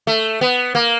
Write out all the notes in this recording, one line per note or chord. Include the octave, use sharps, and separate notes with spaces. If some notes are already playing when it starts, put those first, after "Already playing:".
A3
B3
A#3